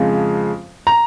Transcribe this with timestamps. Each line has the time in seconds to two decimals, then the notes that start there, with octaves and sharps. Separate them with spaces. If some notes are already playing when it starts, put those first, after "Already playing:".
Already playing: F2 C#3 F3 G#3
0.87 A#5